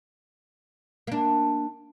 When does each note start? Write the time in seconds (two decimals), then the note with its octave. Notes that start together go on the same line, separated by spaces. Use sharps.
1.07 A#3 D4